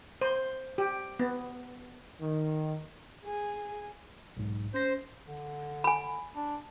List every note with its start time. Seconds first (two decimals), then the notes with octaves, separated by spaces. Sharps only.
0.21 C5
0.78 G4
1.19 B3
2.21 D#3
3.24 G#4 G#5
4.37 B1 G#2
4.74 C#4 C5 A#6
5.27 D3
5.84 G#5 B5
6.35 D4